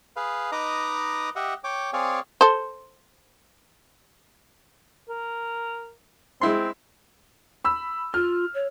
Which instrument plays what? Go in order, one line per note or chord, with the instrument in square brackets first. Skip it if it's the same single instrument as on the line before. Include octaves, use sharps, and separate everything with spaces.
[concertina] G#4 B4 F5
D#4 B4 D#5 A#5 D6 D#6
G4 D#5 E5 F#5
C#5 G5 D6
C4 G#4 C#5 D5 F5 G#5
[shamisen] A4 C5
[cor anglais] A#4
[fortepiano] G#3 E4 C6 [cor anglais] C4
[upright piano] B5 E6
[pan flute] F4 [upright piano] F6
[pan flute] C#5